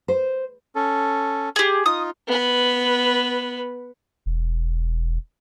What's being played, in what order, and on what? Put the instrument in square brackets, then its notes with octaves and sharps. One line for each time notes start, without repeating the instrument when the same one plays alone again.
[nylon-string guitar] C5
[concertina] C#4 A4
[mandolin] G4 G#4
[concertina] D#4 F4 [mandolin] D#6
[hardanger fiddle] B3 B4
[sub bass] E1